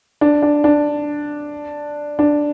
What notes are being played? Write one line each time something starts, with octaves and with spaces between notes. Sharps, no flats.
D4
D4
D4
D4